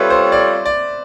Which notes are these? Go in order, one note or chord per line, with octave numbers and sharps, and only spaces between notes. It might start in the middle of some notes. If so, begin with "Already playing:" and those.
Already playing: G3 C4 F4 A4 B4 C#5 E5
C5
D5
D5